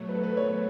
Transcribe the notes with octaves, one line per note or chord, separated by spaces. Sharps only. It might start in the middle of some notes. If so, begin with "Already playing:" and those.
Already playing: B2 F#3 A3 C#5
B4
A4
B4
C#5